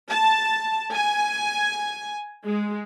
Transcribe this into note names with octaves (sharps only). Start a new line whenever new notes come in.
A5
G#5
G#3